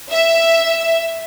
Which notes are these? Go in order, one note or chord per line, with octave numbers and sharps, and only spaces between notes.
E5